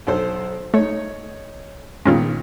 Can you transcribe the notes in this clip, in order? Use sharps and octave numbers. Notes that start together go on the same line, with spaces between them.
B1 A4 C5
A3 D#4 C#5
A#2 D#3 G#3 B3 C#4 F4